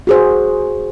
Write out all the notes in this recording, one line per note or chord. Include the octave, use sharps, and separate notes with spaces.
F#4 G#4 C5